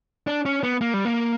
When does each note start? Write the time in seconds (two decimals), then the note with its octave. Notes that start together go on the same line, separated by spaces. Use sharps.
0.27 D4
0.45 C#4
0.63 B3
0.81 A#3
0.94 G3
1.05 A#3